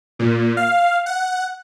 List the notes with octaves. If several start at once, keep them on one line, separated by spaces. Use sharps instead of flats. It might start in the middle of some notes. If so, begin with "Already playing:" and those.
A#2
F5
F#5